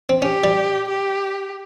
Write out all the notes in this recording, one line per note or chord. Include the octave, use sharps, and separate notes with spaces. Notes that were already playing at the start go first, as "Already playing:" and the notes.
C4
C#4 G4
G3
G4